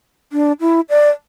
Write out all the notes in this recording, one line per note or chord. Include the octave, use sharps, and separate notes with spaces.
D4
E4
D5